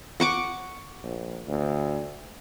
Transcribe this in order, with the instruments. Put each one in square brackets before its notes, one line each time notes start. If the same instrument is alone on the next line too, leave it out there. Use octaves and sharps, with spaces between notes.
[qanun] F#5 C#6 D6
[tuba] A#1
D2